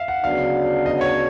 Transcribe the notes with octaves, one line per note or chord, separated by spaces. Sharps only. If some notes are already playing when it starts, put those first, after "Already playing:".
Already playing: E5 F5
F#5
D2 C#3 F#3 B3 D4 F5
D#5
C#5